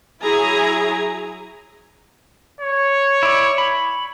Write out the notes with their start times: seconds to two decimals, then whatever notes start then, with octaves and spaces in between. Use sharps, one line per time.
0.23 F#3 E4 G#4 G#5 A#5
2.61 C#5
3.23 E4 D5
3.58 B5